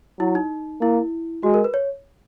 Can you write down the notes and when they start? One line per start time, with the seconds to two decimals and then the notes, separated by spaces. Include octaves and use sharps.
0.19 F#3 E4
0.35 D#4
0.81 A#3 E4
1.43 G#3 F#4
1.54 A#4
1.64 B4
1.74 C#5